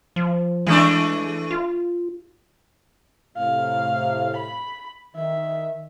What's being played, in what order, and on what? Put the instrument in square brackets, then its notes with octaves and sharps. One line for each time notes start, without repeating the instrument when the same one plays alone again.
[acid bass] F3
[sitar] E3 A3 D4 [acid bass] G#3
[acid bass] F4
[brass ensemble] A2 C3 [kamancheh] F5
[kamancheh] B5
[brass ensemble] D#3 [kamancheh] E5